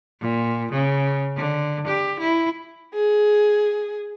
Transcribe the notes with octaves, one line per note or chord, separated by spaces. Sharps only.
A#2
C#3
D3
G4
E4
G#4